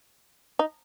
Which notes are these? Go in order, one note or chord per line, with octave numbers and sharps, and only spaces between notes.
D#4